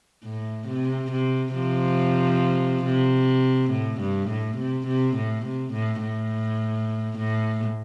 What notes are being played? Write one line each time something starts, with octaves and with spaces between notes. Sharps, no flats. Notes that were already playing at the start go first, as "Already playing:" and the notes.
A2
C3
C3
C3 F3
C3
A2
G2
A2
C3
C3
A2
C3
A2
A2
A2